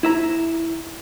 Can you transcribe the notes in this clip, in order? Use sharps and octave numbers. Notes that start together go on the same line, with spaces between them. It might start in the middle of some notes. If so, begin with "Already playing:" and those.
E4 E5 A#5